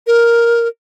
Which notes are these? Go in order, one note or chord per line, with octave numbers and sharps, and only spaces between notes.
A#4